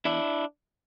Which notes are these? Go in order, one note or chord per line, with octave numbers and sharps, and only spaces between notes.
E2 D4 E4